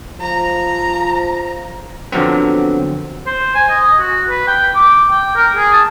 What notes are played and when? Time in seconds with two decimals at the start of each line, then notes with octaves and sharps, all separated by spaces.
0.20 F3 A#5
2.12 D3 F3 F#3 B3 C4
3.26 C5
3.55 G#5
3.69 D#5
3.97 F#4
4.30 B4
4.48 G5
4.75 D6
5.11 G5
5.35 A#4
5.56 G#4
5.73 A5